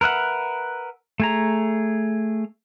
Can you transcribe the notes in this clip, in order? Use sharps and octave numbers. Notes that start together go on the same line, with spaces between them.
A#4 B4 E5 F#5
A3 G#4 A#5